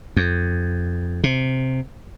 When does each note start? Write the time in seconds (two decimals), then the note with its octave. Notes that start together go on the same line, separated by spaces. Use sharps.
0.16 F2
1.24 C3